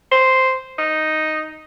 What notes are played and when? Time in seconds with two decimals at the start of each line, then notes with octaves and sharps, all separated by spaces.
0.12 C5
0.78 D#4